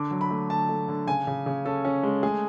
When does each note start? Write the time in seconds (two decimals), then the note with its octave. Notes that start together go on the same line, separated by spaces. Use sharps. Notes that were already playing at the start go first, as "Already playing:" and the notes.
Already playing: D3 D6
0.11 F#3
0.21 B5
0.30 A3
0.50 D3 A5
0.69 A3
0.88 D3
1.07 C#3 G#5
1.27 C#3
1.46 C#3
1.65 C#4 A4
1.85 C#4
2.03 G#3
2.23 A3 G#4